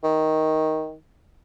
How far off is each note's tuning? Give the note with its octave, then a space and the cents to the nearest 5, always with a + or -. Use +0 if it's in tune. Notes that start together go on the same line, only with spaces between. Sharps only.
D#3 +10